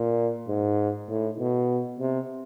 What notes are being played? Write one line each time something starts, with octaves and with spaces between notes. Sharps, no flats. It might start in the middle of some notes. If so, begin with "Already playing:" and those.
Already playing: A#2
G#2
A2
B2
C3